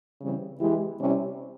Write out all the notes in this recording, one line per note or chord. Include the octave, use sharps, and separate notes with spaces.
C#3 E3 G3 C4
E2 E3 G#3 E4 G4
C3 G3 C#4 E4